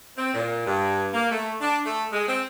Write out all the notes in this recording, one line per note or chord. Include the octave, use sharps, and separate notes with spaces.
C4
A#2
G2
A#3
A3
D4
A3
G#3
C4